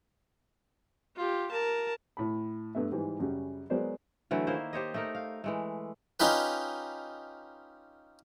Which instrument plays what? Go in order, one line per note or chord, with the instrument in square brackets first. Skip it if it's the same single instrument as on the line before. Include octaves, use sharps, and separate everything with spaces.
[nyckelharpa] F4 G4
A#4 A5
[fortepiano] A2 B5
G2 A3 B3 E5
G#2 E3 G3
F#2 C#3 G3
F#3 G#3 B3 A#4 C5 D5
[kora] D3 E3 F#3 A3
D#3 A#3 E4 C5
G4 C5 C#5 D#5
A3 D#4 A#4
F5
E3 G#3 A3
[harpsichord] C#4 D#4 F4 G4 B4